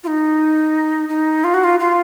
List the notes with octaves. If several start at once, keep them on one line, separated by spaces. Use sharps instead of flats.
F4
D#4
D#4
F4
F#4
F4
F4